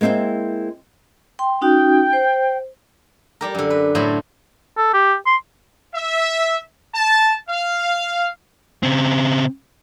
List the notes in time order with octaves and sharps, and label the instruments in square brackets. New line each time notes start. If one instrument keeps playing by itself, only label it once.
[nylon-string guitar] G#3 A#3 C4 E4 G5
[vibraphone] G5 C6
[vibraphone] C#4 D#4 F#4 [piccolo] G5
[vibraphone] C5
[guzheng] G3 G4 A#4
F#2 D3
B4
A2 F#3 A3 C5 B5
[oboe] A4
G4
C6
[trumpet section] E5
A5
F5
[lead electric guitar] C#3 C4